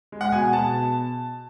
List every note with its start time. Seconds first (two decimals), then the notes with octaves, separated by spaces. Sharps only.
0.12 G#3
0.21 F#5
0.32 B2 G#5
0.53 B2 A5